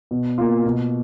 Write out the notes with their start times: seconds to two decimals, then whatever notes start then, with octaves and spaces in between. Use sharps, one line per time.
0.11 B2
0.38 A#3 F4
0.65 B2